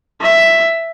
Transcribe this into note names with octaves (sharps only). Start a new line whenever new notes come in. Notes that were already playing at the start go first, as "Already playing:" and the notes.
E5